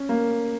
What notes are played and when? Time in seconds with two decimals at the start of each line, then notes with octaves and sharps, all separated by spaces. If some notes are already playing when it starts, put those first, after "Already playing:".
Already playing: C#4
0.09 A#3